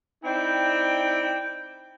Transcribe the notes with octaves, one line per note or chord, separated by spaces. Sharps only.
C4 D#4 E4 D5 G5